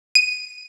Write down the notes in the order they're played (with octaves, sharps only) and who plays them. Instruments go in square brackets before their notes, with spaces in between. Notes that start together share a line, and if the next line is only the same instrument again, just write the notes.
[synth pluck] D#7